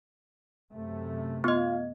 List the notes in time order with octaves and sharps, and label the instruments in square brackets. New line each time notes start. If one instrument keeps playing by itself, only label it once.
[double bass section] F#2 C3 A3
[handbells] B3 D#5 [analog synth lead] F4